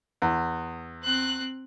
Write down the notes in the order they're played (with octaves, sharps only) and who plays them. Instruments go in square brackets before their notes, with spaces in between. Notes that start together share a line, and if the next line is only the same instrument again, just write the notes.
[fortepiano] E2
[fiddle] C4 F#6